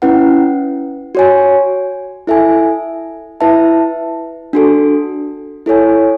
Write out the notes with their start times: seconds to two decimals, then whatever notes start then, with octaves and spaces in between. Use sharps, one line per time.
0.02 C#4 E4 B4 F#5
1.15 F#4 C#5 G#5
2.27 E4 A4 E5 G#5
3.41 E4 B4 E5 A5
4.53 D4 F#4 A4
5.66 E4 A4 C#5 G#5